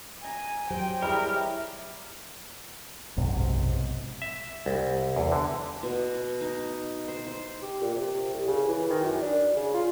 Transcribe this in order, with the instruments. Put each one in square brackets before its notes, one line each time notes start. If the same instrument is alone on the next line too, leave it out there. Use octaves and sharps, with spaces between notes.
[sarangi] G#5 [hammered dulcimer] A#5
[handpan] F#3 G4 C5 [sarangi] G5
[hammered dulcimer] G3 E4 B4 [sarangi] G4 [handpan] G#4 C#5 D#5 [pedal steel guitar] A#4
[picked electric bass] F#1 B1 G#2 C3
[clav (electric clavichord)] E5
C2
E2
D3
[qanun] B2
D#4
C5
C5
[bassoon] G4
A#2
C3
C2
C#3
E3
D#3
F#2
D4
C#3
F4